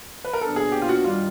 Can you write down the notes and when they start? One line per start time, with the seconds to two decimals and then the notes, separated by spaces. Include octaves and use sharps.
0.25 B4
0.33 A#4
0.41 A#2 F#3 B3 D4 A4
0.56 G#4
0.72 G4
0.82 F4
0.89 F#4
1.04 G2 D#3 G3 F4